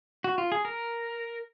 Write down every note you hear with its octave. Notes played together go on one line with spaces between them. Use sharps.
F#4
F4
G#4
A#4